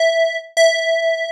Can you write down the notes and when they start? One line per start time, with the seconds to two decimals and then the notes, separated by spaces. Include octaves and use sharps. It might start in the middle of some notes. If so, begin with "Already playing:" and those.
Already playing: E5
0.57 E5